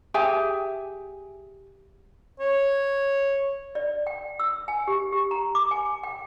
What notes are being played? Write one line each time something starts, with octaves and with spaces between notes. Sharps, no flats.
G4 G#4 E5 G#5
C#5
D5
G5
E6
G#5
G4
G4
A#5
D6
G#5
G5